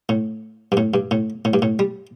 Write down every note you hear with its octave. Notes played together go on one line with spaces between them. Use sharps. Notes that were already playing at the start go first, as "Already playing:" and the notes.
A2
G2
A2
G2
A2
A2
G2
A2
G3